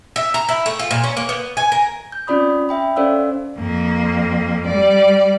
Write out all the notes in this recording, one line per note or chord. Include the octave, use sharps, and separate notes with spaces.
E5
A#5
E4
A3
F4
A#2
C#4
A#3
B3
G#5
A#4
G6
C4 C#4 F4 D5 B5 D#6
E5 G5 B5
C#4 A4 C5 D5 F5 E6
F2 A#3
G3 D5